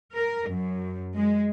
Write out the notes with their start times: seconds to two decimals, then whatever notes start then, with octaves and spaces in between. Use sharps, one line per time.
0.14 A#4
0.49 F#2
1.16 G#3